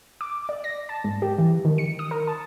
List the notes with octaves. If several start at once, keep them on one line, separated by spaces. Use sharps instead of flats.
D6
D5
A#6
A5
G#2
G4
E3
D#3
C#7
D#6
A#4
A5